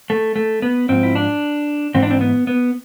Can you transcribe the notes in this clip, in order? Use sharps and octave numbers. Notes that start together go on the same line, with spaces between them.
A3
A3
B3
G#2 F3 C4
E4
D4
G#2 E3 C4
D4
C4
B3
B3